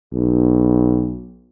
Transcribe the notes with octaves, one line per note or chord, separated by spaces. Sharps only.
B1